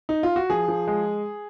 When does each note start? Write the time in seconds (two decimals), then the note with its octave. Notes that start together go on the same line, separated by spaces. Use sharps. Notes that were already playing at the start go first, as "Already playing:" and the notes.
0.09 D#4
0.23 F4
0.36 F#4
0.50 F3 G#4
0.68 F3
0.87 G#3